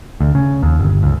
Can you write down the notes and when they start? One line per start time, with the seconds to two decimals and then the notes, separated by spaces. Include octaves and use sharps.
0.21 D2
0.35 C#3
0.63 D#2
0.79 G1
1.03 C#2